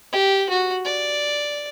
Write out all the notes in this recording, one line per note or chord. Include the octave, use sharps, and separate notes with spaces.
G4
F#4
D5